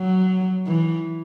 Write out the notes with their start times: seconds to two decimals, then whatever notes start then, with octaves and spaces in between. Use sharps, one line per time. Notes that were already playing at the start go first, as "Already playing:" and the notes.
Already playing: F#3
0.67 E3